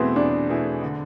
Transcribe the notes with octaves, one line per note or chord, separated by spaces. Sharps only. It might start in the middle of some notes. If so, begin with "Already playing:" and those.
Already playing: E2 B2 A3 B3 C4 E4 G#4
E2 D4
B2 A3 E4 G#4
D3